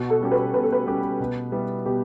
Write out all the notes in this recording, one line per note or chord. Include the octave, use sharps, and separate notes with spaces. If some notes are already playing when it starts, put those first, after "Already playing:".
Already playing: B2 F#4
A4
G3 C#4 G4
B4
B2 B4
A4
B4
G3 C#4 G4
B2
G3 B3 E4
B2 G4